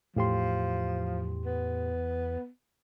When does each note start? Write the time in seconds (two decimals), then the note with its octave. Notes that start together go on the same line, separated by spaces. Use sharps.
0.16 E2 A2 F3 G4 C6
1.45 B3